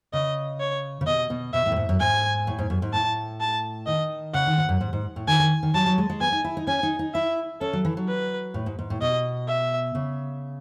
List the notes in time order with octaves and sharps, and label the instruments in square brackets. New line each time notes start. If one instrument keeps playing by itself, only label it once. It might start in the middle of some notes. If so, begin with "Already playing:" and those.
[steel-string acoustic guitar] C#3 [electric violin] D#5
[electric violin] C#5
[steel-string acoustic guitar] C#3
[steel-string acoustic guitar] B2 [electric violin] D#5
[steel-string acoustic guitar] B2
[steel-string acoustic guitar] B2 [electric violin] E5
[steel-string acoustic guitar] A2
F#2
G#2
F#2
[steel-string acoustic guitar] G#2 [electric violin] G#5
[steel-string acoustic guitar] A2
G#2
F#2
G#2
[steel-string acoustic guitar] A2 [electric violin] A5
[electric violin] A5
[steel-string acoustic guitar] D#3 [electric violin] D#5
[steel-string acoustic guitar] C#3 [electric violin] F#5
[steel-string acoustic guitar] D#3
G#2
F#2
G#2
G#2
A2
[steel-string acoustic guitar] D#3 [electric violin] G#5
[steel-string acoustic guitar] D#3
D#3
[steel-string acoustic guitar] F#3 [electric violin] A5
[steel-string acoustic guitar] F#3
G#3
G#3
[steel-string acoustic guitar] B3 [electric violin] G#5
[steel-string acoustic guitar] D#4
E4
D#4
[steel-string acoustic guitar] C#4 [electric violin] G#5
[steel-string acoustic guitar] D#4
D#4
[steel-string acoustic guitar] E4 [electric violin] E5
[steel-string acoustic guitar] C#4 [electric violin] A4
[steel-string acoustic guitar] F#3
E3
F#3
[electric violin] B4
[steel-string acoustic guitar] A2
G#2
G#2
A2
[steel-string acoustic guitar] B2 [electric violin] D#5
[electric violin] E5
[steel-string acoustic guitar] C#3